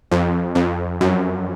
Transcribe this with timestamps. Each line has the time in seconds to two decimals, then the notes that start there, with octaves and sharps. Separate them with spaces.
0.11 F2
0.55 F2
1.01 F#2